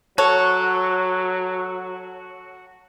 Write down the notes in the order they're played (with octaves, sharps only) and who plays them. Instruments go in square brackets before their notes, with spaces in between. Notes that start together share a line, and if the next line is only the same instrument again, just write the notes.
[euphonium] F#3 [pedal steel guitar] F#4 [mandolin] A4 [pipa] C#5